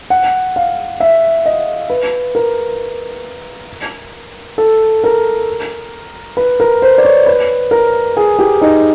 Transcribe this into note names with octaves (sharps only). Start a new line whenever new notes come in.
F#5
F5
E5
D#5
B4
A#4
A4
A#4
B4
A#4
C5
D5
C#5
B4
A#4
G#4
G4
D#4